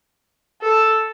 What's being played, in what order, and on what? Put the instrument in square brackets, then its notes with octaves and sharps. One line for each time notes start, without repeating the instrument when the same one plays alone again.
[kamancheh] A4